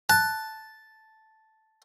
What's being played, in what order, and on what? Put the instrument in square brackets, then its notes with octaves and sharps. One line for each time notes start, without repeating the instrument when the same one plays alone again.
[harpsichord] A5 [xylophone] F#6